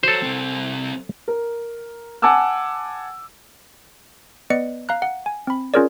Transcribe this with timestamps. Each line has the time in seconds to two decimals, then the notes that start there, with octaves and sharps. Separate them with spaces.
0.03 F#4 A4 C5 C#5
0.22 C2 C4
1.28 A#4
2.22 F#5 G#5 A5 D6 E6
4.50 B3 B4 D5 D#5 C#7
4.89 F5 A#5 F#6
5.02 F#5
5.26 G#5
5.47 C4 B5
5.74 C#4 F4 G#4 A#4 C#5 D5